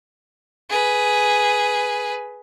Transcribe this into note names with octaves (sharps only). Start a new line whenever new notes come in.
G#4 B4